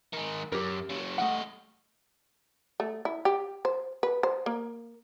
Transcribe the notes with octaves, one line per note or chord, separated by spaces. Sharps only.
D#3 G#3
F#2 G4 A#4
C#3 F#3
G3 A3 D#5 F#5
A3
E4
G4
C5
B4
C5
A#3